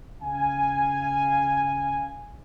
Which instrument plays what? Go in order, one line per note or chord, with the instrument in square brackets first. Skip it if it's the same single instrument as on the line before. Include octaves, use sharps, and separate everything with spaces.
[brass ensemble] C#3 F5 G#5